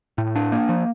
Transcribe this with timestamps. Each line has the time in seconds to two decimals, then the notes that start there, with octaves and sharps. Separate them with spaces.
0.18 A2
0.35 D4
0.52 A#3
0.69 F3